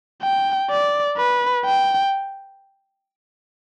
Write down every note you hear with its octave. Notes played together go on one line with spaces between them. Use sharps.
G5
D5
B4
G5